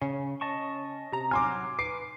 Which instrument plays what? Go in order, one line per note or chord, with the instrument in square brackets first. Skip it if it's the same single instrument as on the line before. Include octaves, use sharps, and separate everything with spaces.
[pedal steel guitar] C#3 [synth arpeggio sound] C#4
[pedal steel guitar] D#5 A5 C#6
[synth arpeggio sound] C3 A#5
[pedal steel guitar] F#3 F6 [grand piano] G#5 C6 D6
[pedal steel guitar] B4 [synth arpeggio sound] D6 [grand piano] C7